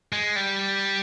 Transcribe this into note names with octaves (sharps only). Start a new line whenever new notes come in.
G#3
G3